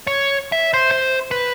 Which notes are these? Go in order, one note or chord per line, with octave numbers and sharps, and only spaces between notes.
C#5
E5
C5
C5
B4